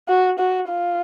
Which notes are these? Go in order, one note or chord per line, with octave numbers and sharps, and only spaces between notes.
F#4
F#4
F4